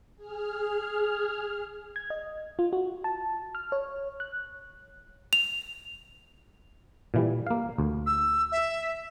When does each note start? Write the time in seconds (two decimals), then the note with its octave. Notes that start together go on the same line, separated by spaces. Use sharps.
0.16 G#4 F6
1.96 G#6
2.10 D#5
2.59 F4
2.73 F#4
3.04 A5
3.55 F6
3.72 C#5
4.20 F#6
5.33 F7
7.14 A#2 E3 G3
7.47 A#3 F5
7.78 D2
8.06 E6
8.51 E5